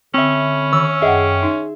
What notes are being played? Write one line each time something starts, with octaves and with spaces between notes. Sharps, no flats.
D3 C4 C#4 E5 B5
D#3 E6
F#2 G#4 D#5 E5 F#5 G5
D#4